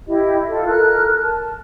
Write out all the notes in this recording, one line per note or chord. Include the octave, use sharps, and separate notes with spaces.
E4 G4 D#5
F4 A4
A4 A#4 F6 F#6
A5